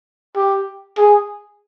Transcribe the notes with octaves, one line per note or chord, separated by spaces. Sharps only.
G4
G#4